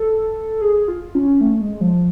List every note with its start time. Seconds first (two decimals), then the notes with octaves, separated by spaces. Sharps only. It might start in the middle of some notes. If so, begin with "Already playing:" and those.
Already playing: A4
0.61 G#4
0.88 F4
1.15 C#4
1.41 A3
1.61 G#3
1.81 F3